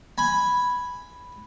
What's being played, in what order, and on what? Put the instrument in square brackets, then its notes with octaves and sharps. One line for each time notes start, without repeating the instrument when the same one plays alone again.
[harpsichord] G#5 B5